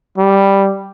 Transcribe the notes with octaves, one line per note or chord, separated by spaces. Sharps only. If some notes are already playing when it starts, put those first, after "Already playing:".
G3